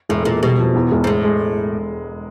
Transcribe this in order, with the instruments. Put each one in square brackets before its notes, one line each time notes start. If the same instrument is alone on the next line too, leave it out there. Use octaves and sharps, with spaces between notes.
[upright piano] E1 [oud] A2
[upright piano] E1 [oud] A#2
[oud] B2 [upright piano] G3
[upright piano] F2
E2
E1
[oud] G#2
[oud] A2 [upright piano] G#3
[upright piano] G#3